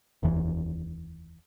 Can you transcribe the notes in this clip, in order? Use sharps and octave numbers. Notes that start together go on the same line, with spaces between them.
F1 D#2 E3